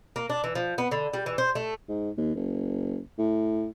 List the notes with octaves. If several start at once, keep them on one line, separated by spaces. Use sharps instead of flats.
A#3
D4
E3
F3
B3
D3
G3
E3
C5
A3
G#2
D#2
F#1
A2